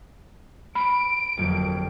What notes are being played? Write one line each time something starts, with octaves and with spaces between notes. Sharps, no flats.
B5 D7
G1 F2 F3 F#3 A#3 F#4